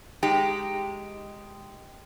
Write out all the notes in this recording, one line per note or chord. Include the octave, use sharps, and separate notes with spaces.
G#3 D#4 G4